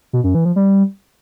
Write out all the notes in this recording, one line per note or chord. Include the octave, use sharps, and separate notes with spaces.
B2
F#2
E3
F3
G3